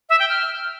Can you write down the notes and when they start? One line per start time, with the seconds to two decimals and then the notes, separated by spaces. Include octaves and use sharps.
0.09 E5
0.19 G5
0.29 F6